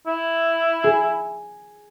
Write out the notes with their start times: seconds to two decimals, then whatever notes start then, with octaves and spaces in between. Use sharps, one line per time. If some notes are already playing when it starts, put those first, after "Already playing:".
0.07 E4
0.84 G#4